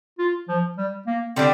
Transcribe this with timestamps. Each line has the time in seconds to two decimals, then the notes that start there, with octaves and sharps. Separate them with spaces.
0.19 F4
0.48 F3
0.77 G3
1.07 A#3
1.36 D3 G3 C4 D4